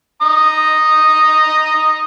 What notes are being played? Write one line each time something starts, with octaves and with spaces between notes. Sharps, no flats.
A#5 D#6